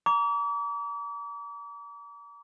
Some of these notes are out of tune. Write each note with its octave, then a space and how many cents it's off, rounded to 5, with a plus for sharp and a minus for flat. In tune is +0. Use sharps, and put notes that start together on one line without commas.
A#5 +0 D6 -40